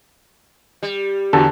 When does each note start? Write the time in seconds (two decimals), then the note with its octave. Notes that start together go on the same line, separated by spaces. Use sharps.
0.83 G3
1.33 E2 D3 F#4 G4 A4 A5